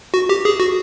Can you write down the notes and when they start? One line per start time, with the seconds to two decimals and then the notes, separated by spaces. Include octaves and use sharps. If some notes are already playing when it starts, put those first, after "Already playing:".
0.14 F#4
0.29 G4
0.45 G#4
0.60 F#4